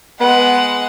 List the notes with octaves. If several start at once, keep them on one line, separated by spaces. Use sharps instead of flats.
G#3 B3 F#5